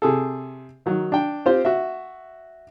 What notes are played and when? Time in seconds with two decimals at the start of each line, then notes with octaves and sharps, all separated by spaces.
0.02 C3 G#4 A4
0.86 D#3 F#3
1.12 D4 G5
1.46 C4 F4 G4 C5
1.65 F#4 E5